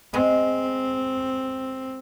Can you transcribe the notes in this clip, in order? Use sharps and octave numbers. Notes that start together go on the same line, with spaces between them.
G#3 C4